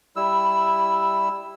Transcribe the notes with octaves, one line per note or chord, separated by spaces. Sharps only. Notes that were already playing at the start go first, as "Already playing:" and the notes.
G3 E4 E6